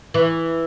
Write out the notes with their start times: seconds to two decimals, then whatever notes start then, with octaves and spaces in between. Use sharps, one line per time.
0.14 E3